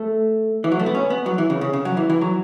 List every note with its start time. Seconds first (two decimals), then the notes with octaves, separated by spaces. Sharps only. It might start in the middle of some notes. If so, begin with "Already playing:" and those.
Already playing: A3
0.64 E3
0.72 F#3
0.79 A3
0.86 B3
0.95 C#4
1.10 B3
1.26 F#3
1.38 E3
1.50 C#3
1.61 C#3
1.73 C#3
1.85 F#3
1.97 E3
2.10 E3
2.21 F#3